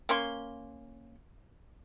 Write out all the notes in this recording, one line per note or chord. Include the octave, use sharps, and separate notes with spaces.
A#3 C#4 C6